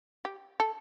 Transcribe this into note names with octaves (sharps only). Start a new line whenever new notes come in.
G4
A4